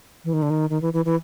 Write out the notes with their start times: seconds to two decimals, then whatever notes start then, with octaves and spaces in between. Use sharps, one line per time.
0.25 E3
0.33 D#3
0.42 D3
0.50 D#3
0.70 D#3
0.82 E3
0.93 E3
1.05 E3